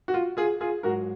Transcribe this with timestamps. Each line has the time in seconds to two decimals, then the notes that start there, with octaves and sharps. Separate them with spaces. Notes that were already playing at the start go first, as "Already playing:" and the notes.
0.08 F#4
0.14 F4
0.37 F4 G#4
0.61 F4 G#4
0.83 G#2 F#3 F#4 A#4